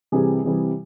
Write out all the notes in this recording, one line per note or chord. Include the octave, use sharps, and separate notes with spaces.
C3 E3 G3 G#4
C3 E3 G3